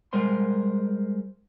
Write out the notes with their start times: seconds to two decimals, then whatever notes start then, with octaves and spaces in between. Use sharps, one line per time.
0.13 G3 G#3 A#4 C5 C6